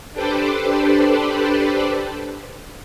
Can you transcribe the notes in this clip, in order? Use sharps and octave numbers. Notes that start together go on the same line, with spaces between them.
D4 G4 A4 B4 C5 D5